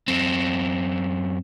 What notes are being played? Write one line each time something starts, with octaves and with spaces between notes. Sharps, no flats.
F#2 C4